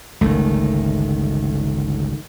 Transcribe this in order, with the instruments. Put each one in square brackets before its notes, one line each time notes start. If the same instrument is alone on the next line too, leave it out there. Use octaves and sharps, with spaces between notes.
[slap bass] G1 C#2 [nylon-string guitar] D#3 A3